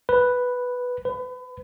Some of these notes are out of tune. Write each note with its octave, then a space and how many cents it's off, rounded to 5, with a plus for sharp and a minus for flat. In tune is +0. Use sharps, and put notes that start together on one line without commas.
B4 +0
B4 +30